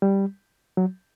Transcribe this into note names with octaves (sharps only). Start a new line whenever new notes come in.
G3
F#3